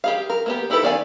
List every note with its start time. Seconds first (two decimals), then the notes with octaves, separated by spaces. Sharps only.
0.04 G4 G#4 F5
0.30 A#4
0.46 A#3 B3 G4
0.70 D#4 E4 G4 A4 B4
0.83 D#3 B3 D5 F5 G#5